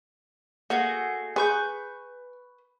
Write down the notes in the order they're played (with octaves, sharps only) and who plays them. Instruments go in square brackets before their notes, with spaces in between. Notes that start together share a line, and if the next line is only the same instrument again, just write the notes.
[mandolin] A3 F#4 G#4 [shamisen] A#3
[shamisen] G#4 [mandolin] B4 C#6 G6